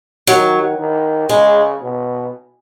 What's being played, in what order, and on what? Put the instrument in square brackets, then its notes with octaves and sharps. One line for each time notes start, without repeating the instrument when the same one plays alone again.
[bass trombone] D#3 [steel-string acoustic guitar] F#3
[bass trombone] D#3
[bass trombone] C#3 [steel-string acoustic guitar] G#3
[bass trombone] B2